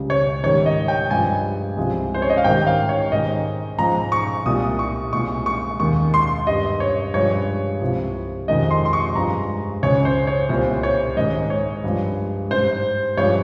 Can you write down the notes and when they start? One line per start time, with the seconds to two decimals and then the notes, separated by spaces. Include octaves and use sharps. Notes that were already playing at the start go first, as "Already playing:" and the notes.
Already playing: C#2 C#3 G3
0.10 C#5
0.44 G#2 D#3 G3 C#5
0.66 D#5
0.88 G5
1.11 G2 F3 G#3 G#5
1.77 C2 C3 F3 G#3
2.14 C5
2.22 C#5
2.30 D#5
2.37 F5
2.44 G#2 D#3 G3 G5
2.67 F5
2.89 C#5
3.12 G#2 D#3 G#3 D#5
3.78 G#2 F3 G#3 A#5
4.12 C#6
4.46 C2 A#2 G3 D#6
4.79 C#6
5.13 C2 A#2 G#3 C#6
5.46 C#6
5.80 D#2 D#3 G#3 C#6
6.14 C6
6.47 G2 G3 D#5
6.80 C#5
7.14 G2 F3 G#3 C#5
7.81 C2 C3 F3
8.48 F2 C3 D#3 G#3 D#5
8.71 C6
8.85 C6
8.93 C#6
9.15 G2 F3 G#3 A#5
9.82 C#2 C#3 G#3 C#5
10.05 C5
10.27 C#5
10.49 C2 A#2 G3 C5
10.83 C#5
11.17 G#2 D#3 G#3 D#5
11.50 C#5
11.84 G2 F3 G#3
12.51 G#2 G3 C5
13.17 G2 F3 G#3 C#5